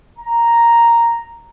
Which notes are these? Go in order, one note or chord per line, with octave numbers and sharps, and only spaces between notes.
A#5